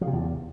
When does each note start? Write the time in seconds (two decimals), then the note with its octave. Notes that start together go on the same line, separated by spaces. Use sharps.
0.01 F3
0.07 C3
0.13 E2